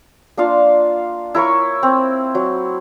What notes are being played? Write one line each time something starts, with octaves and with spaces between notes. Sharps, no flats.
A#3 D4 F4 F5
E4 A#4 C#5 C#6
C4
F#3